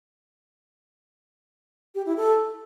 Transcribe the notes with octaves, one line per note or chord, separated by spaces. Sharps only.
G4
E4
A4